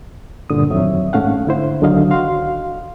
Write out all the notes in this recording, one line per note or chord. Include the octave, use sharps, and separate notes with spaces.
G2 A#2 D3 D#6
F2 D#3 F#3 C4 C#5 E5
G#2 A3 C#4 F5 F#5
D3 E4 C5
C2 D3 D#3 F#3 D#5 F5
F#4 F5 C6